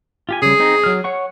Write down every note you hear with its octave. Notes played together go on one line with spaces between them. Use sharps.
F4 G4 G#5
C#3 G3 G#4
C4 D#4
F#3 F6
C#5 F#5 C#6